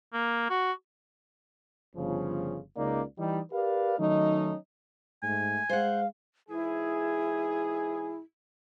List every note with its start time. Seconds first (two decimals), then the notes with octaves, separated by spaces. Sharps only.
0.14 A#3
0.50 F#4
1.96 G1 C#3 F3
2.77 C#2 C#3 A#3 D#4 D5
3.19 E3 G3 D#4
3.53 G4 A#4 B4 D5 F5
3.99 D#3 F#3 A3 C#4 D#4
5.23 G#2 A3 G#5
5.70 G#3 C5 F5 F#5
6.49 G#2 E3 E4 G#4